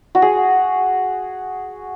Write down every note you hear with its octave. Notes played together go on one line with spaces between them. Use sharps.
F#4
G#4